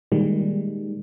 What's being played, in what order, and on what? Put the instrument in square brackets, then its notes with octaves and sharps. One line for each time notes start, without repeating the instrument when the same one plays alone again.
[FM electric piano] A#2 D#3 G3 G#3